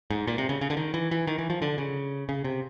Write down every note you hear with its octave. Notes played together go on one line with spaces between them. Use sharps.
G#2
A#2
C3
C#3
C#3
D3
D#3
E3
E3
D#3
E3
F3
D3
C#3
C#3
C3